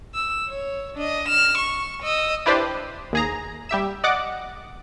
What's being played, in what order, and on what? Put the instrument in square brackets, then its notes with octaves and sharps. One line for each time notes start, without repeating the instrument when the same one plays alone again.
[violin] E6
C#5
D4 D#5
F6 E7
C#6
D#5 E6
[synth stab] D4 E4 G4 B4 C5 D5
D#2 G#4 A#5
G3 G4 E5 E6
D5 D#5 F#5 D6